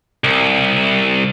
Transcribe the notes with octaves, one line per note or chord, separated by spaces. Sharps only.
C2